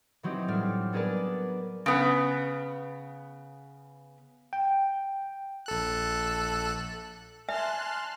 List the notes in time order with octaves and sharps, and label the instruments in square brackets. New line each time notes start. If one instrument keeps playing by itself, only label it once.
[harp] E3 F#3 C4 D#4 G4
A2 F#3 G3 D4 D5 F6
B3 D4 G#4 A#4 B4 D5
[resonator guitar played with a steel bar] C#3 B3
[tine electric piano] G5
[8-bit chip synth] A#1 A4 F#6
[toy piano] E5 [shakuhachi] G#5 [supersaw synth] A5 C6 F#6 [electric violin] F6